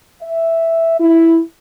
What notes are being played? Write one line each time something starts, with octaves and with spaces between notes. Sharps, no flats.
E5
E4